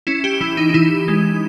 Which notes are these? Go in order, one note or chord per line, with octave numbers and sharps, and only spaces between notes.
C#4 E4
G4
E3 E4
D#4
D#4
E3 E4
G#3